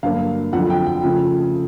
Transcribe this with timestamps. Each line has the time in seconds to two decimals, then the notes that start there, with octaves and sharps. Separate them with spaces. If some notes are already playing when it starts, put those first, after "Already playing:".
0.03 G2 D3 F#3 A#3 F5
0.53 F2 D3 F#3 F#5
0.70 G5
0.86 G5
1.03 C#3 F3 A3